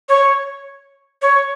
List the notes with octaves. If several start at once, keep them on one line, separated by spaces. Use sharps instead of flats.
C#5
C#5